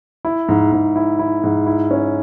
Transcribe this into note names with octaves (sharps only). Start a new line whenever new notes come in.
E4
G#2
G#2
E4
E4
G#2
E4
C#4